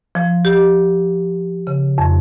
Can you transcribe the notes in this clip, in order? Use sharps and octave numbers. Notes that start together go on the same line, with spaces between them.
F3
G4
C#3
F2